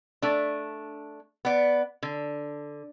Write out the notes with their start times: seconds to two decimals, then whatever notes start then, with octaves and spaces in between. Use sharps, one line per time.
0.22 A3 D4
1.45 B3 D5
2.03 D3